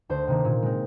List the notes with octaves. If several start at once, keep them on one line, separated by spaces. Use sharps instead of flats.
D2 C5
C3 D#3 A#3
A#2
G#3 C4